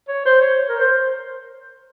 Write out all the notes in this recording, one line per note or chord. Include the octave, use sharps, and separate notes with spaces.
C#5
C5
C#5
A#4
C5